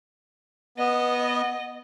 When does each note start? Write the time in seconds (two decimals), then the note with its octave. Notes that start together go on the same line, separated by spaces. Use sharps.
0.78 B3 D#5